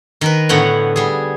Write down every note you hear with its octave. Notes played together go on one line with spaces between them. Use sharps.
D#3 A#4 B4
A2 D3 B3 C#5 F#5 G5
G3 G#4